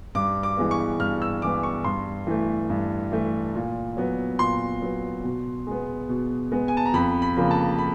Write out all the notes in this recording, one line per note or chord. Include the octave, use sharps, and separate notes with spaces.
G2 D6
D6
E3 G#3 B3
C#6
G2 F6
E6
E3 G#3 B3 D6
C#6
G2 C6
E3 A3
G2
E3 A3
A#2
F#3 B3
A#2 C6
F#3 B3
B2
G#3 B3
B2
G#3 B3
G#5
A5
A#5
F2 B5
B5
C#3 F3 A#3
A5
B5